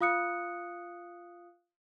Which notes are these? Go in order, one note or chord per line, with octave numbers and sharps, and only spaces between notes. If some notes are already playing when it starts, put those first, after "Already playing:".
F4 F5 D#6 F#6 C#7